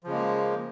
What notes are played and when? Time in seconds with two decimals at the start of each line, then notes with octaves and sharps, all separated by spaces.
0.04 F3
0.07 C#3
0.10 G#3
0.13 A#3